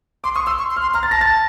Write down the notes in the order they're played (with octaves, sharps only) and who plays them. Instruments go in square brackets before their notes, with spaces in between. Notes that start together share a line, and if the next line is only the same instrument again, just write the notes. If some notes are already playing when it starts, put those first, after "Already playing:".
[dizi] C6 [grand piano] D6
[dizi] C#6 [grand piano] D#6
[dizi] C6 [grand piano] E6
[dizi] C#6
C6
[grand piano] F6
[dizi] C6
[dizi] A#5 [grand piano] F6
[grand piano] A6
[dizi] A5 [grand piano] A#6
[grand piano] A6